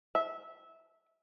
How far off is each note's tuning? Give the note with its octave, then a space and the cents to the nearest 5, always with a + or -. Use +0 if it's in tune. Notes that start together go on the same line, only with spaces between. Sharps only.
E5 -15